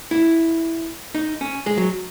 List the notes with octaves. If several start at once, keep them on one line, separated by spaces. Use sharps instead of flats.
E4
D#4
C#4
G#3
F#3